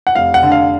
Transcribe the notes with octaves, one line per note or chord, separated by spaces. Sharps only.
F#5
F1 F5
F#5
D3
F5